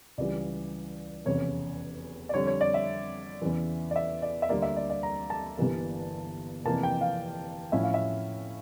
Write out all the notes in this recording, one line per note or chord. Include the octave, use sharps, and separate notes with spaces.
C#2 C#3 E3 G3 D5
F1 E2 C#3 C#5
D5
F2 D3 G3 C#5
C#5
D5
E5
E2 C#3 E3
D5
E5
D5
E5
D2 D3 G3 A#3 D5
E5
D5
D5
A#5
A5
G1 G2 E3 A#3
F1 F2 E3 A#3 A5
G5
F5
A2 F3 C#4 E4 E5
F5
E5